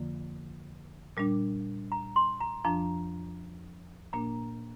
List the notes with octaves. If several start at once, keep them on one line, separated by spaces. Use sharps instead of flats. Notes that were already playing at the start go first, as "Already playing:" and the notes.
Already playing: F2 D3 F3 A#3
A#2 G3 D4
A#5
C6
A#5
F2 F3 D4 A#5
A#2 A#3 D4 A#5